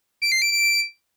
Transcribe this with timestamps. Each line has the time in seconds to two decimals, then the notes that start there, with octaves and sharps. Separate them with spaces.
0.22 D7
0.32 C7
0.42 D7
0.52 D7